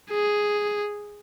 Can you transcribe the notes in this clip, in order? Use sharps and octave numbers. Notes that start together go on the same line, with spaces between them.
G#4